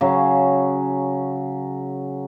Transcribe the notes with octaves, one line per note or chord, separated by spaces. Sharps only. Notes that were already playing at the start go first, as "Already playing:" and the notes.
C#3 F#3